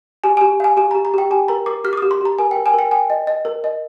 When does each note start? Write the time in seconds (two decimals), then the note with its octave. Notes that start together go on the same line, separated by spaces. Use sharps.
0.24 G4 G#5
0.37 G#5
0.41 G4
0.60 F5 G#5
0.77 G4 G#5
0.91 A#5
0.95 G4
1.05 A#5
1.14 G4 G5
1.31 G4 G#5
1.48 A#4 A#5
1.66 A#4 D6
1.84 G4 F6
1.93 D6
1.97 D#6
2.02 G4
2.11 C6
2.21 G4 A#5
2.39 A#4 G#5
2.51 G5
2.56 A#4
2.66 G#5
2.74 A#4 G5
2.91 G5 G#5
3.10 D#5
3.27 D#5
3.45 A#4
3.64 D#5